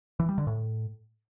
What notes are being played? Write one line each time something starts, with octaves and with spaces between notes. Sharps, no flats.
E3
G3
D3
A2